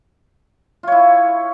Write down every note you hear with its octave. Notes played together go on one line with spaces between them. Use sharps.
E4 F4 C#5